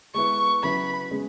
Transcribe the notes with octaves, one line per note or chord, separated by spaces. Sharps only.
G#3 B3 E4 B4 C#6
C#3 F#3 E4 B4 B5
C#3 G#3 B3